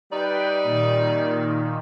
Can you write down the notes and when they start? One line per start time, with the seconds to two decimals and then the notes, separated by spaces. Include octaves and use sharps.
0.11 G3 D#4 B4 D5 G5
0.63 A#2 D#3